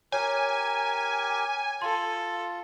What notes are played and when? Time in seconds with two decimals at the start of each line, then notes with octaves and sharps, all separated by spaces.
0.12 G4 A#4 C#5 G#5
1.82 F4 A4 C6